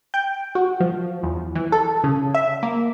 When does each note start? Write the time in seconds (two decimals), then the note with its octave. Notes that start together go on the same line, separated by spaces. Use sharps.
0.14 G5
0.55 F#4
0.80 F3
1.23 E2
1.55 E3
1.72 A4
2.04 C#3
2.35 E5
2.63 A#3